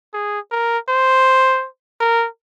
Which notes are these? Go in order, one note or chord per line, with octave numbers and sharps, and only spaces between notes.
G#4
A#4
C5
A#4